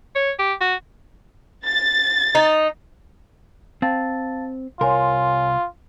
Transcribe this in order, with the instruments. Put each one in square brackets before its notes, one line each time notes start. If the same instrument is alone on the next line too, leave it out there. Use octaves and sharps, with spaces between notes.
[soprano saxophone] C#5
G4
F#4
[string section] A6
[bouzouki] D#4
[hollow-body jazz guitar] C4 [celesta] F5 A5 A6
[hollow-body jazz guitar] C2 A#4 [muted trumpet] F4 [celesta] C#5 G#5 C6